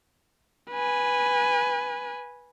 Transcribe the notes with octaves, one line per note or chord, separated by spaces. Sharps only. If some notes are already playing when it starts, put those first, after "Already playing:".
B4 G#5